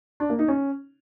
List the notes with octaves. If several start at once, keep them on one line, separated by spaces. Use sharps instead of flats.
D4
A#3
D#4
C#4